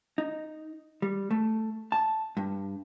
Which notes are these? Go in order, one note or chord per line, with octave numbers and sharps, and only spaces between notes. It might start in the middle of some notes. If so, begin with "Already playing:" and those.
D#4
G3
A3
A5
G2